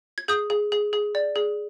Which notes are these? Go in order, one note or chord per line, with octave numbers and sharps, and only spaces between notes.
G#6
G#4 D#6 G6
G#4
G#4
G#4
D5
G#4